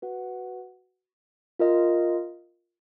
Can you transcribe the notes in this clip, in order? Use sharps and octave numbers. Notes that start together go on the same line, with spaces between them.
F#4 B4 F#5
F4 A#4 D#5